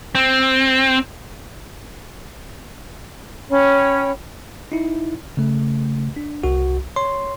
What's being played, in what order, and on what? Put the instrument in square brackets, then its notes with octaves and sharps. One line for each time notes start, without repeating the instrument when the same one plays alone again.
[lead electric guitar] C4
[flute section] C#4 C#5 G5 B5
[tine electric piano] D#4 E4
C#3 A3
D4
C2 F#4
C#5 C6